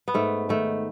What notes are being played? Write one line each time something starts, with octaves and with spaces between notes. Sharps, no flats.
B3
G#2 A3
D#3 A3